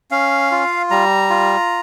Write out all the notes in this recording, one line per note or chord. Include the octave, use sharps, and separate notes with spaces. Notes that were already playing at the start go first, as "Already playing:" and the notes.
C#4 F5
F4
G3 A#5
F4